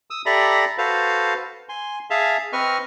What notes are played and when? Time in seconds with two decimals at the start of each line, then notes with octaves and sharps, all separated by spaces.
0.10 D#6 E6
0.26 G4 A4 D5 E5 A#5 B5
0.78 F#4 A4 B4 C5 F5
1.69 G#5 C6
2.10 G#4 E5 F5 A5
2.53 C4 B4 D#5 C#6 F6